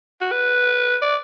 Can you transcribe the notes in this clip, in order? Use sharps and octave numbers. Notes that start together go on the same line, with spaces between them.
F#4
B4
D5